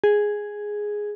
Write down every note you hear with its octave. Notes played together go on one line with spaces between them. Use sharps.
G#4